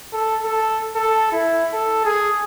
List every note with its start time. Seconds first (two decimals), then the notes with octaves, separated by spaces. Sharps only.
0.13 A4
0.44 A4
0.96 A4
1.32 E4
1.73 A4
2.05 G#4